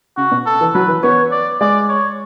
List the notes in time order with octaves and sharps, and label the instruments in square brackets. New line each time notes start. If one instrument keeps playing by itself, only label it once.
[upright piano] C#3 [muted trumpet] F#4
[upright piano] B2
[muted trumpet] A4
[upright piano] E3
[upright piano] F#3 [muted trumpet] B4
[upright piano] E3
[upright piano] B3 [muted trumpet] C#5
[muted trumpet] D5
[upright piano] G#3 [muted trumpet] D5
[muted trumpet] C#5